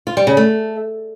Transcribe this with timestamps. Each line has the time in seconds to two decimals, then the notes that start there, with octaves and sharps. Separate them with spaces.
0.07 F4
0.17 G3
0.27 C#3
0.37 A3